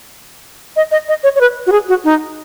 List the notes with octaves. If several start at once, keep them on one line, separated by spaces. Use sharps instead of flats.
D#5
D#5
D#5
C#5
C#5
B4
F#4
G#4
F#4
D#4